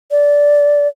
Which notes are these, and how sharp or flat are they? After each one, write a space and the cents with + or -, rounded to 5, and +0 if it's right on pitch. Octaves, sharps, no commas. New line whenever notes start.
D5 -15